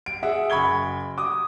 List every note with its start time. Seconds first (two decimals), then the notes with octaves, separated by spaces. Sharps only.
0.06 D7
0.23 G#4 E5 F#5
0.50 F#1 B5 C#6 G#6 G7
1.18 D6 D#6